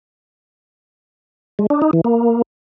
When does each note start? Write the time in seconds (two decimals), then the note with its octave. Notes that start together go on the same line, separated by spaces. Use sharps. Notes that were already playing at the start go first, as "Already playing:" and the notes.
1.59 G#3
1.70 D4
1.82 D#4
1.93 E3
2.04 A#3